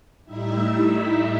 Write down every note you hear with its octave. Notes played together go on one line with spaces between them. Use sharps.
A2 G3 D#4 E4 E5